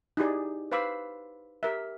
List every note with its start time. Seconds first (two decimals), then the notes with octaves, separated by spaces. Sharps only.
0.17 D#4 E4 G4 G#4 D5
0.72 B4 C5 F5 B5 D6 E6
1.63 G4 A#4 E5